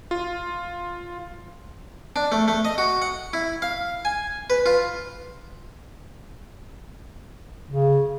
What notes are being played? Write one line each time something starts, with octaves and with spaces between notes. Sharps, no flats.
F4
D4
A3
A3
D#5
F#4
F#5
E4
F5
G#5
B4
F4
C#3